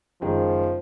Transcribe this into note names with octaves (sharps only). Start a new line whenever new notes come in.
F#1 D#3 F3 G#3